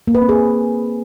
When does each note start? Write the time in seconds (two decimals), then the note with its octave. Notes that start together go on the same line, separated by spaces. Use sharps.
0.07 A#3
0.15 B4
0.22 C4
0.29 G#4